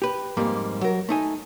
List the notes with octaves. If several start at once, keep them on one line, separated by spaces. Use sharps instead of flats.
G4 B4
F2 G#2 G3 A#3
F#3 A#4
A3 D#4 G#5